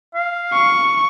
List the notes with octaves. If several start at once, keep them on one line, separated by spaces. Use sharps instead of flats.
F5
C#6